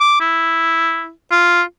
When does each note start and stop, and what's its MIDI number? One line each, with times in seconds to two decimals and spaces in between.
0.01 0.17 86
0.21 1.11 64
1.32 1.62 65